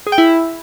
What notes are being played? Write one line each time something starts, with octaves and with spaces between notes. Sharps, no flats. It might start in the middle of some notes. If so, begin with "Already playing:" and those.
G#4
G5
E4